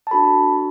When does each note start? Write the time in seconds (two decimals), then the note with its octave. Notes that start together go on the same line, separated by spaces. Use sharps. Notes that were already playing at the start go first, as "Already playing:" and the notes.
0.07 A5
0.11 D4 F#4 A4 B5